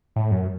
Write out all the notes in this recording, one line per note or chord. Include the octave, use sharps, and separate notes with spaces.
A2
F#2